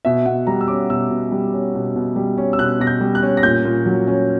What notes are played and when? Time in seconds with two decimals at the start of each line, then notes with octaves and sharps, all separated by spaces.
0.05 B2 E5
0.26 B2 F#5
0.47 G3 A#5
0.61 E6
0.68 C#4 D6
0.90 B2 E6
1.10 B2
1.32 G3
1.53 C#4
1.75 B2
1.95 B2
2.16 G3
2.38 C#4
2.53 E6
2.59 B2 F#6
2.80 B2 A#6
2.87 G6
3.01 G3
3.15 F#6
3.23 C#4
3.37 A#6
3.43 A#2 G6
3.65 A#2
3.86 F#3
4.07 C#4